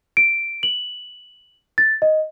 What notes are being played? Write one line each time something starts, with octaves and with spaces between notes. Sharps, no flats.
D7
F#7
A6
D#5